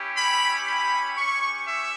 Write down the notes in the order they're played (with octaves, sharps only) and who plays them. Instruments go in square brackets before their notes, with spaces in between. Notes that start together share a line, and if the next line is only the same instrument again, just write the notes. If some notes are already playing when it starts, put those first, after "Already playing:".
Already playing: [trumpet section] C#4 E4 G4
B5
B5
C#4 G4 C#6
E5